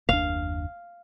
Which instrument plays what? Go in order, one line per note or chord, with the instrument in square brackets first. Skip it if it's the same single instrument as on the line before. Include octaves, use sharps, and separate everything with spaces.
[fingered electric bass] F#1 D#2 D4 [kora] F5